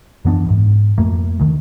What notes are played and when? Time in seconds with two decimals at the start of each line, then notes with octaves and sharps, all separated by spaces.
0.25 F#2 E3 B3 D4
0.47 D1 G#2
0.98 F2 A3 A#3
1.40 D2 D#3